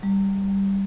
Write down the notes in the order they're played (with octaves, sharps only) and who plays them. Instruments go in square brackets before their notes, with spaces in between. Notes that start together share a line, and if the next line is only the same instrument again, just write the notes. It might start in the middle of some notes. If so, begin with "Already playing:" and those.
[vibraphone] G3